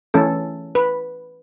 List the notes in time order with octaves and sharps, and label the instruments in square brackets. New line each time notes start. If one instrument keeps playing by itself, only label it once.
[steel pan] E3 A3 C#4 A4
B4